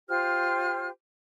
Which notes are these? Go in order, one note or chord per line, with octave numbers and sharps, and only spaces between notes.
F4 G4 C5 F6